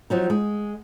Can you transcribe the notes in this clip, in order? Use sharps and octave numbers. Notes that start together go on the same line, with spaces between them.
F3 F#3 D#4
G#3